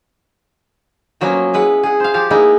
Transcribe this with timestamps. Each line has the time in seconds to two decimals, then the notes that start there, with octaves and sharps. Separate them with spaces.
1.21 F3 F#3 A#3 B3 C#4
1.53 G#3 E4 B4 F#5
1.83 G#4 F#5
2.00 C5 F5
2.14 F3 G4 F5 A5
2.30 G#3 A#3 B3 D#4 E4